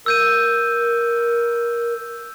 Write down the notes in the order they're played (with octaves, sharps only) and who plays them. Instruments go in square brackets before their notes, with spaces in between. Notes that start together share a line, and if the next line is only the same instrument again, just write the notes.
[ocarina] A#4 [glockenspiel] E6 G6 D#7